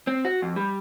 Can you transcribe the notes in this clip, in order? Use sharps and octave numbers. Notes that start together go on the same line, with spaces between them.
C4
F#4
F2
G3